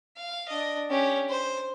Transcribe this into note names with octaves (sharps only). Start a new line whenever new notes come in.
F5
D4 D#5
C#4 G4
C5